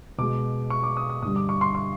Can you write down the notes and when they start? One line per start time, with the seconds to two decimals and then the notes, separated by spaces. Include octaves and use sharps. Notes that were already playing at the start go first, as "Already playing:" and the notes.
0.18 B2 G#3 D6
0.70 C#6
0.83 D6
0.97 D#6
1.10 D#6
1.22 G2 D3 G3 D#6
1.36 D6
1.49 C#6
1.61 C6
1.75 C#6